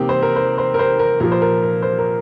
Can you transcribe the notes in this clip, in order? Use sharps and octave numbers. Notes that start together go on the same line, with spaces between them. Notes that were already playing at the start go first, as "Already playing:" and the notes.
Already playing: C3 A#3 C4 D#4 G4
C5
A#4
C5
C5
A#4
C5
A#4
A#2 F3 A#4
C5
A#4
A#4
C5
A#4